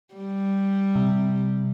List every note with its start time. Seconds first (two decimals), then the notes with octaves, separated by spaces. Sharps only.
0.15 G3
0.95 C3